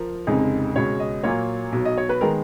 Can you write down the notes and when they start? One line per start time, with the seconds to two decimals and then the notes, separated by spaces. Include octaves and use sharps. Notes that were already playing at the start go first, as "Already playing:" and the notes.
Already playing: F3 A#4
0.27 F1 F2 C#3 G#3 D#4
0.76 C#2 B2 G#3 C#4 C#5
1.00 D#5
1.24 A#2 F#3 A#3 F4 C#5
1.72 B1 B2 F#3
1.85 D#5
1.98 C#5
2.09 B4
2.21 D#3 G#3 B3 A#4